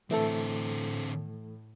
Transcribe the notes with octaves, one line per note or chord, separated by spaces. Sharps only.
A2 D3 E3 A3 C4 A4